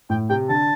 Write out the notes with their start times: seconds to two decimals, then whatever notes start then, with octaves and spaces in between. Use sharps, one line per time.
0.10 A2 G5
0.29 C3 G5
0.49 D3 A5